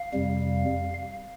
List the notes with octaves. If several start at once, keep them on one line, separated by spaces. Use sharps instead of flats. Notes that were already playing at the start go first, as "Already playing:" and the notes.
Already playing: F5
F2 C3 G3